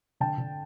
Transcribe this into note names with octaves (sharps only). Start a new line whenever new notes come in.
D3 G5 A5
D3